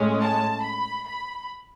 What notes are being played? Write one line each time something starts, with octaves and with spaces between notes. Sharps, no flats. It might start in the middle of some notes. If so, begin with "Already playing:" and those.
Already playing: A2 G#3 C#4
A5
B5
B5